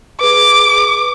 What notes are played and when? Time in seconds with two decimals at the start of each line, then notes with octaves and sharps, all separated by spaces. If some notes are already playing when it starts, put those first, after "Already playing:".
0.21 G#4 B4 D6